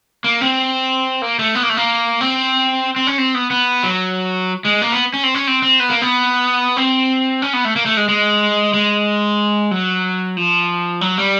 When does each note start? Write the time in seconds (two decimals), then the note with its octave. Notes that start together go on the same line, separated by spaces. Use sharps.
0.24 A#3
0.41 C4
1.22 A#3
1.39 A3
1.55 B3
1.63 A#3
1.69 A3
1.77 A#3
2.21 C4
2.96 C4
3.07 C#4
3.18 C4
3.34 B3
3.51 B3
3.83 F#3
4.65 G#3
4.82 A#3
4.92 B3
5.14 C#4
5.23 C4
5.35 C#4
5.47 C4
5.63 C4
5.80 B3
5.90 A#3
6.02 B3
6.77 C4
7.42 C#4
7.53 B3
7.65 A3
7.76 A#3
7.86 A3
7.97 G#3
8.08 G#3
8.74 G#3
9.71 F#3
10.37 F3
11.01 F#3
11.18 G3